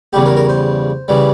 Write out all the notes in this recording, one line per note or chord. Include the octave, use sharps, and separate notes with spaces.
E2 C#3 G3 G4
A#4
A#4
C5
C#3 E3 G3